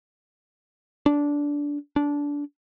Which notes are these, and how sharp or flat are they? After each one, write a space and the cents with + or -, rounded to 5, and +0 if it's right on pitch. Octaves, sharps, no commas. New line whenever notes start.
D4 -15
D4 -20